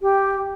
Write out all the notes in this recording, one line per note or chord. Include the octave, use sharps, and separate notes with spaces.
G4